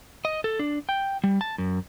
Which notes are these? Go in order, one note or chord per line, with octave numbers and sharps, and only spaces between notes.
D#5
A4
D4
G5
G3
A5
F#2